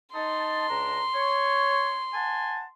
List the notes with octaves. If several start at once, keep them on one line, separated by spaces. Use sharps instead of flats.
D#4 A5 C6
C#2 D4 A#5
C#5
F#5 G#5 A5